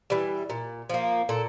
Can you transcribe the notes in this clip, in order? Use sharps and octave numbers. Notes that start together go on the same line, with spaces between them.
E3 G3
A#2
F3 A#3
A#2 A4